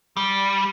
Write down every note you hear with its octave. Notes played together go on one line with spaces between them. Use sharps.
G3